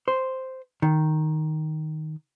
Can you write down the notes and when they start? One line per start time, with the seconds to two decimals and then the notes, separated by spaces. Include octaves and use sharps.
0.08 C5
0.82 D#3